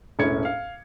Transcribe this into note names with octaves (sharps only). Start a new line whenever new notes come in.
E1 A2 C#4 G#6 C#7
F5